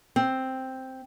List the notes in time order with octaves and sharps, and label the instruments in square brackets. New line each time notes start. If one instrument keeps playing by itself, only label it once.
[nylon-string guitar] C4